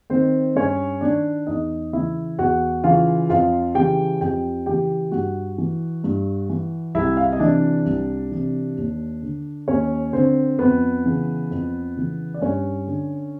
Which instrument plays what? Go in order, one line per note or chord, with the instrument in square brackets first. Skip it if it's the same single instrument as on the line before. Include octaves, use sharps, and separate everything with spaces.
[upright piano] D#3 C4 C5
G2 C#4 C#5
D#3 D4 D5
E2 D#4 D#5
C#3 E3 E4 E5
E2 F#4 F#5
C#3 E3 F4 F5
F2 F4 F5
C#3 E3 G4 G5
F2 G4 G5
C#3 E3 G4 G5
G2 F#4 F#5
E3
G2
E3
C2 E4 E5
F5
E5
D#5
C3 E3 D4 D5
C2
C3 E3
D#2
D3
D#2 C#4 C#5
D3 C4 C5
F2 B3 B4
C#3 E3
F2
C#3 E3
D5
G2 C#4 C#5
D3